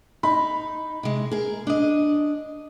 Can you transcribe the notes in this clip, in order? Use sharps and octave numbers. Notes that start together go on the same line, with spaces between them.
D#4 B5
C3 G#3
G#4 A#4
D4 D#5